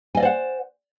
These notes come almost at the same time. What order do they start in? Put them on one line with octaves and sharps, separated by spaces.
G#5 D#5 D5 C5 F#5